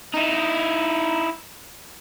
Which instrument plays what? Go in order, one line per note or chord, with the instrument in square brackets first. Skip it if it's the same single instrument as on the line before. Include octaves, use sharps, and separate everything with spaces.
[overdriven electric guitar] D#4 E4